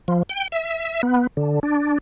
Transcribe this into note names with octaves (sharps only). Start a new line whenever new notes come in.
F3
G5
E5
B3
D3
D4